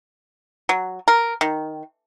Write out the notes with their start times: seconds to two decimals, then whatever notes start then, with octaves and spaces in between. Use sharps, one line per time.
0.69 F#3
1.08 A#4
1.41 D#3